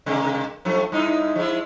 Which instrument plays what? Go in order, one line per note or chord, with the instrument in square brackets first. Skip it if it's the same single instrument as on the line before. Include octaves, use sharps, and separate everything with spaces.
[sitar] C3 G#3 A#3
F#2 F3 A3
G2 D#4 E4
F3 G#3 E4